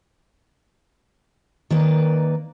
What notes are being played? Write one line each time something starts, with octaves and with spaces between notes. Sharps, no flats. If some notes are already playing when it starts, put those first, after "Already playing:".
D#3 A#3 B4 D5